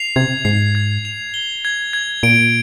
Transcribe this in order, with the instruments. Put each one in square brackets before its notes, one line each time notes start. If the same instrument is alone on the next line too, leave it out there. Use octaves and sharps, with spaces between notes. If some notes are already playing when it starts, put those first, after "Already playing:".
Already playing: [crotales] C7 F7
[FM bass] C3 [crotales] G#6
[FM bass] G#2 [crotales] C7
[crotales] G#6
F7
G7
G#6
G#6
[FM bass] A#2 [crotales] D7